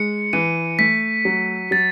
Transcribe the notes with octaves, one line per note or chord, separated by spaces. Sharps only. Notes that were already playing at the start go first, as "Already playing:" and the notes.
Already playing: G#3 C#7
E3 D#7
A3 B6
F#3
F#3 A6